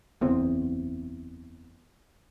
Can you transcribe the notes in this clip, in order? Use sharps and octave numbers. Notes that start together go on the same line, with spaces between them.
F#1 E2 C4